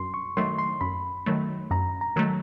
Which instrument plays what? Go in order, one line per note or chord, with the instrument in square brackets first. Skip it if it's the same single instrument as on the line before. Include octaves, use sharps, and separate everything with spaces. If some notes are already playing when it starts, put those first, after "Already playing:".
Already playing: [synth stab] F#2 [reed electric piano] C6
[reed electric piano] C#6
[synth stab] D#3 F#3 A3 [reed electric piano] C6
[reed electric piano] C6
[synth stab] F#2 [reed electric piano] B5
[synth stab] D#3 F#3 A3
[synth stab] F#2 [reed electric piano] A#5
[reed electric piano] A#5
[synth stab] D#3 F#3 A3